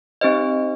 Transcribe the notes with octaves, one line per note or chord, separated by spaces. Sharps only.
C4 D#4 G4 C5 D#5